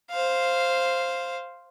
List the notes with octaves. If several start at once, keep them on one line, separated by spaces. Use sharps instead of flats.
C5 F5